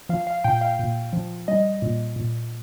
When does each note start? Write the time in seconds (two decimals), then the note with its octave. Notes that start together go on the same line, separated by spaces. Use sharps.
0.09 F3 F5
0.27 F5
0.44 A#2 G5
0.61 F5
0.79 A#2
1.13 F3
1.48 G3 D#5
1.82 A#2
2.16 A#2